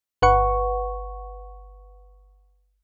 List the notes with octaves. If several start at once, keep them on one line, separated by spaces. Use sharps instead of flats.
G1 B4 F#5 C#6